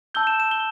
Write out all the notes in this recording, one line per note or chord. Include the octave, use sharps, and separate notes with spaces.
A5 E6 G6 G7
E7
E7
G7